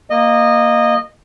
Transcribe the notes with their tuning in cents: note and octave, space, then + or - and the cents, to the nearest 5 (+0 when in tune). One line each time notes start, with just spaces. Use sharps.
A#3 +0 D#5 -15